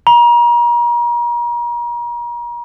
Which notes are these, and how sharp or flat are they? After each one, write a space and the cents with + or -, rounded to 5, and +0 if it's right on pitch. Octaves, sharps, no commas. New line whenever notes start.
A#5 +35